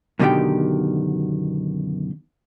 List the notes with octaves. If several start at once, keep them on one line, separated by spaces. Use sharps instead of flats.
F#2 B2 D3 D#3 G4 G5